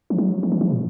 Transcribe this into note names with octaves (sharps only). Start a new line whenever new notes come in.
F3
F#3
F3
E3
F3
A#2